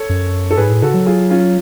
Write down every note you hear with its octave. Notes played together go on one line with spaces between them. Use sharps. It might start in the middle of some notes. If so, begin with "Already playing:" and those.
Already playing: A4 C#5
F#2
A4
G#2 G#4 B4
A2
C#3 F#4 A4
F#3
F4 G#4
C#4 F4